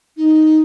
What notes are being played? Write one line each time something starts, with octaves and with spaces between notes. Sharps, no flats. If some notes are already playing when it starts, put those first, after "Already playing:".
D#4